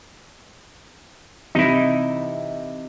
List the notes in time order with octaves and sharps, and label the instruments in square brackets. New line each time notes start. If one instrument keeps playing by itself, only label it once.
[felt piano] C3 E3 [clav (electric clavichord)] D#4 E4